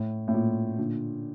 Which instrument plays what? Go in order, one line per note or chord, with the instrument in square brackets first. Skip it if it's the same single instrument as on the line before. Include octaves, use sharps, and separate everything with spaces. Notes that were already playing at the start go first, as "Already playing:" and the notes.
Already playing: [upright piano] A2
A2
A#2
A#2 D3